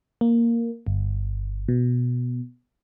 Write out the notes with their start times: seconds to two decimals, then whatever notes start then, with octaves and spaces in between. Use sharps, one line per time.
0.21 A#3
0.87 G1
1.68 B2